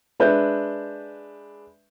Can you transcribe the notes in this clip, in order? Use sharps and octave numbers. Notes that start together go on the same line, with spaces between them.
G#3 D4 B4 E5 G6